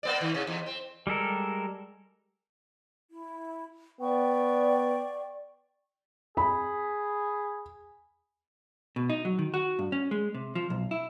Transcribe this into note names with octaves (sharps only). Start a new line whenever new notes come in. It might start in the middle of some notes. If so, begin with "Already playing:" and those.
A#3 B3 D5
D#3
C3
E2
C4
G3 G#3 A4 A#4
E4
B3 D5 G5 C#6
G#4 B5
B2
D#4
F#3
D#3
F#4
G2
C#4
G#3
C3
F3
B1
E4